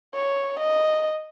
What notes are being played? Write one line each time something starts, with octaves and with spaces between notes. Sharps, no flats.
C#5
D#5